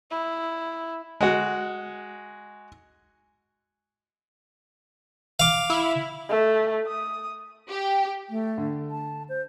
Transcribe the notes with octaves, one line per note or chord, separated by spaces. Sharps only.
E4
G#3 F#4
F5 D6
E4
A3
D#6
G4
A3
D3
A5
C5